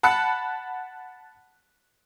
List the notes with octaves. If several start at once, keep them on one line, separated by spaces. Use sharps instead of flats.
F#5 A5 B5 F#6 C#7